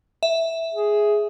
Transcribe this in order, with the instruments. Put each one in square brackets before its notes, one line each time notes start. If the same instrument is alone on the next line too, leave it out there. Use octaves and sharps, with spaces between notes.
[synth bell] E5
[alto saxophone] G#4